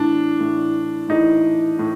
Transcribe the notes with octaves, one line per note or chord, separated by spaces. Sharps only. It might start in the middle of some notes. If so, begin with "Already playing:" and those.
Already playing: A2 E3 D4
A2 E3
A2 E3 D#4
A2